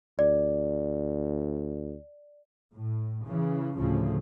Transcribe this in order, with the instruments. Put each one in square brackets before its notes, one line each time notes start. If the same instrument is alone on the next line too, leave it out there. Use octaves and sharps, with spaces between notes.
[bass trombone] D2 [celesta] D5
[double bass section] A2
C#3 E3
D2 A2 C#3 F3